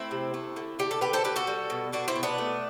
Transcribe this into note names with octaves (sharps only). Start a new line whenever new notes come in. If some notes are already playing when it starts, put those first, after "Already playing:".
Already playing: A3 C4 E4
C3
A3
D3
D3 G4
A4
D3 G4 B4
A4 C5
D3 G4 B4
F#4 A4
G3
B2
B2 D4 F#4
C4 E4
B2
B3 D4
A3